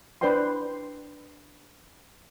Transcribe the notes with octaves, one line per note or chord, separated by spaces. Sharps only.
D4 B4 C5 D5 G5 C6